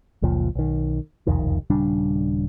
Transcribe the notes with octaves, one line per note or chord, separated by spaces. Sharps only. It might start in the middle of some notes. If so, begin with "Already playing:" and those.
F#1 C#2 A#2 F3
B1 D#3
E1 C2 F2 D#3
D#1 C#3 G3 D4